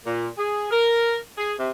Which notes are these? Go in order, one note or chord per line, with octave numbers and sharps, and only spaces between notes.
A#2
G#4
A#4
G#4
C3